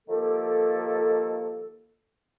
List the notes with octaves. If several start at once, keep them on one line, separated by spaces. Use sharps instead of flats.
D#3 F3 A#3 G4 A4